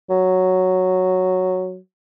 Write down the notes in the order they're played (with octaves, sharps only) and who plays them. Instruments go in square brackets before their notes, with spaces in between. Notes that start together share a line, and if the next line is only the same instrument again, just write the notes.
[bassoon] F#3